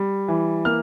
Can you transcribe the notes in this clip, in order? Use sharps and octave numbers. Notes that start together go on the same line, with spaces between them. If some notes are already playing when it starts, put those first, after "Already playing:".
Already playing: G3
E3
A#3 F6